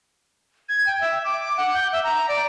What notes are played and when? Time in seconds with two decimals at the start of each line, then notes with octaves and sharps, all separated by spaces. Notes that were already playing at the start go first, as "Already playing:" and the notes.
0.69 G#6
0.86 G5
1.01 E5
1.24 D6
1.57 F#5
1.74 G6
1.93 E5
2.04 A#5
2.29 D5